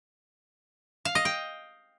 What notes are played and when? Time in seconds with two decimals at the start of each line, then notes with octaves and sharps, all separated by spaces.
1.05 F5
1.15 D#5
1.25 G5